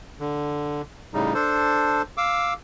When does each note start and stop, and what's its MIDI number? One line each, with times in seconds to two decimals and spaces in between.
0.20 0.82 50
1.14 1.33 45
1.14 1.33 49
1.14 1.33 55
1.14 1.33 63
1.34 2.02 62
1.34 2.02 69
1.34 2.02 72
2.17 2.53 77
2.17 2.53 86
2.17 2.53 88